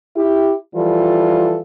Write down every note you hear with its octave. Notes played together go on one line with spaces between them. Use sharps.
E4 G4
E3 F3 G3 F4 A4